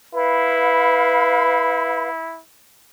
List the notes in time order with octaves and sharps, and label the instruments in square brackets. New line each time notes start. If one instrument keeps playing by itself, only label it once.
[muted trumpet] E4 [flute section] B4 F5 B5